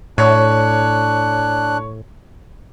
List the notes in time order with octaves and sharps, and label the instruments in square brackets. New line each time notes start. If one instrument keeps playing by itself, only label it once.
[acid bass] A2 [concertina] D4 F#6 [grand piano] C#5